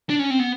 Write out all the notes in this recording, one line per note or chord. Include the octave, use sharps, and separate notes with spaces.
D4
C#4
C4
B3